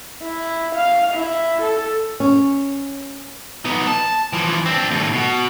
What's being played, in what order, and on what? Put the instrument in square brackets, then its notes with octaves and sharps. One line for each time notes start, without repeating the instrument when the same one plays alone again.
[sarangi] E4
F5
E4
A4
[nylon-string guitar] C#4
[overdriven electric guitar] B3 D#4
A5
E3 F3
C4 D4
D#2 A2
B2